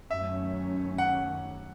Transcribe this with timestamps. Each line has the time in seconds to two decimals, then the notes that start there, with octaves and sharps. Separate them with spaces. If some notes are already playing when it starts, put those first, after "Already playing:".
0.10 F#2 D#3 F#3 A3 C#4 E5
0.98 F#5